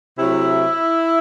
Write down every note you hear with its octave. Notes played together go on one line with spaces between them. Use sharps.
C3 F#3 A3 E4